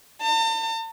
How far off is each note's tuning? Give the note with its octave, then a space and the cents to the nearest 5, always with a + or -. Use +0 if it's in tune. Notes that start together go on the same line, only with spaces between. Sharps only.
A5 +40